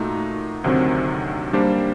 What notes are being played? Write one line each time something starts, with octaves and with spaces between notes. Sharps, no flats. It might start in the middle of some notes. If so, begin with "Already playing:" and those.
Already playing: A#2 A3 D#4 F#4
D2 C3 D#3 F#3 C4
G3 A#3 D4 G4 C5